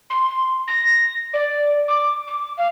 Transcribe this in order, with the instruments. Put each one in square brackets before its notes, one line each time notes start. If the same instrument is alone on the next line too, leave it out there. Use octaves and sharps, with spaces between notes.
[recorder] C6
A#6
D5
D6
D6
F5